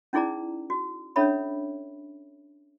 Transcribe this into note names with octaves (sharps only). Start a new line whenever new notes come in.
C#4 D#4 E4 G#4 D5 A#5
F#4
C#4 D4 A4 C#5 E5 B5